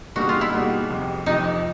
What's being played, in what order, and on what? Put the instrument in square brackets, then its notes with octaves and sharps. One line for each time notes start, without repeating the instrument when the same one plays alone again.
[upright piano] B2 G3 A#3 D#4 G#4 [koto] F#4
[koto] F4
E4
[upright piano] B2 G3 A#3 D#4 G#4
F2 C3 F3
[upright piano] F2 C3 F3 [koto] D#4